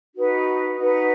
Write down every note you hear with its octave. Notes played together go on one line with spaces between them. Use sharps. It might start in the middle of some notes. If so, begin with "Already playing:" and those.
D#4 F#4 B4 F#5
D#4 F#4 B4 F#5